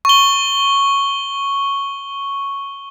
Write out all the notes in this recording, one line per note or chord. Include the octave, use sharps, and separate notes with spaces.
C#6 G7